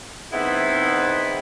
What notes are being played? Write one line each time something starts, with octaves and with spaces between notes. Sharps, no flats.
D#3 G#3 B3 C4 E4